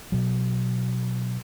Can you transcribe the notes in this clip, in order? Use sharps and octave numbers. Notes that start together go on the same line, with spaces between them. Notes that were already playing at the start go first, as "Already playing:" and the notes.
B2 F#3